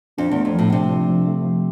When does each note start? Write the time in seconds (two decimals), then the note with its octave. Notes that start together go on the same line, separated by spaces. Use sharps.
0.18 F2 D4
0.31 E2 A3
0.45 F2
0.55 A2 F3
0.72 C3 D4
0.91 F3
1.09 F3
1.27 A3
1.45 F3